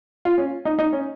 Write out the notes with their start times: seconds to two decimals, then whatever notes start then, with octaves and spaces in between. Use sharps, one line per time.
0.25 F4
0.38 C#4
0.65 D#4
0.79 D#4
0.93 C#4